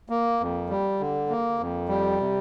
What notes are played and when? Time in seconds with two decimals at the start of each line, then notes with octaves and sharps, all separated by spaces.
0.10 A#3
0.41 F2
0.69 G3
1.00 D3
1.29 A#3
1.59 F2
1.89 G3
2.20 C3